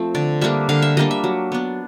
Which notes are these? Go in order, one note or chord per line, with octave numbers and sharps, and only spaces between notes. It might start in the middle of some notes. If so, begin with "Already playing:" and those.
Already playing: F3 A3 C4
D3 D5
G3 A#3 D4 E5
D3 F5
E5
G3 A#3 D4 D#5
E5
F#3
B3 D4